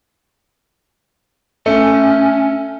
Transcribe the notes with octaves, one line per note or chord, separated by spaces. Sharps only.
A3 C#4